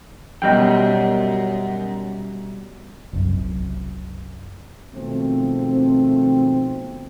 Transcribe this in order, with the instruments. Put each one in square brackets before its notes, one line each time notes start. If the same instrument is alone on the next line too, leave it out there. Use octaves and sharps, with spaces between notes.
[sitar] F#2 [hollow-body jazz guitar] B2 G3 G5 [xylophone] D#5 G6
[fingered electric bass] F#1 C2 F#2
[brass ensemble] B2 D#3 F3 G#3 A3 C4